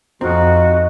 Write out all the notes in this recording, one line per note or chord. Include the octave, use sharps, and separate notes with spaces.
F2 C4 D#4 F#4 F5